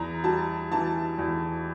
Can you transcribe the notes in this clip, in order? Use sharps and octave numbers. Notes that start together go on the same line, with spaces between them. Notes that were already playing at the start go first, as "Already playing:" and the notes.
Already playing: E2 A#5
G3 A5
E3 A5
E2